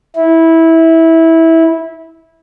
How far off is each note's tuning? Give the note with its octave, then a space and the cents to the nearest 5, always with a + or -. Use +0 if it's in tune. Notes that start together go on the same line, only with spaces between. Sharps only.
E4 -15